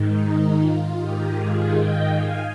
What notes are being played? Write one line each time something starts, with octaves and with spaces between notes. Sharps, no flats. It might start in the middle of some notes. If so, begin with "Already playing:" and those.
Already playing: G#2 D#3 D#4
F4
G#2 D#3 D#4 G4
F4 G#4
D#5 G5
F5 G#5